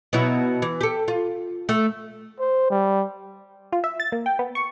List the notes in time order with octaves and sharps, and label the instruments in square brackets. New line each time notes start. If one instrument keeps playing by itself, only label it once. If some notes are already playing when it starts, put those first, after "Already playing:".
[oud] B2 F#3 E4
E3
G4 A4
F4
A3
[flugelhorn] C5
G3
[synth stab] F4
E5
A6
A#3
G5
B3
C#6